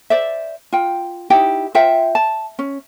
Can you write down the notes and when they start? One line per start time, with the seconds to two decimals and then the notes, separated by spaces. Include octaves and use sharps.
0.10 C5 D5 E5
0.73 F4 G5
1.30 D#4 E4 G4 G5
1.75 F4 C5 E5 G5
2.15 A5
2.59 C#4